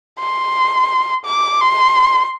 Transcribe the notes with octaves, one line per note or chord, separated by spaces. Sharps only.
C6
D6
C6